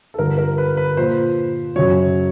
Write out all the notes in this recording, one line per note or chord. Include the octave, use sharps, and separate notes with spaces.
A4
G2 D3 F3 A#4
A#4
B4
B4
A#2 F3 C5
F#2 C#3 F#3 C#5